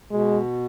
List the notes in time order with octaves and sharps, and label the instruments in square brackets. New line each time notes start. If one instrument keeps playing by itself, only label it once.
[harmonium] B2 [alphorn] G#3